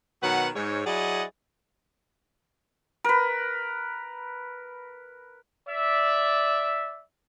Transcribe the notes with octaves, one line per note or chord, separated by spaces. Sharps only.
B2 D#3 F#3 B4 F#5
G#2 C#5
F#3 E4 G#4 D5 D#5 F#5
A#4 B4
D5 E5